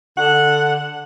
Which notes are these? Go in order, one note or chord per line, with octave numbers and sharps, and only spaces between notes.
D3 F#5